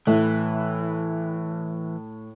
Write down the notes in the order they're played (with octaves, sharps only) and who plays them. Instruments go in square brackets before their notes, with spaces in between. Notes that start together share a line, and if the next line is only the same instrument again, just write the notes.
[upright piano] A2 [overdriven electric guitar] E3